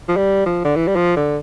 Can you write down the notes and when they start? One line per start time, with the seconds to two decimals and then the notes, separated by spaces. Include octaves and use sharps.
0.09 F3
0.17 G3
0.46 F3
0.65 D3
0.76 E3
0.88 G3
0.96 F3
1.16 D3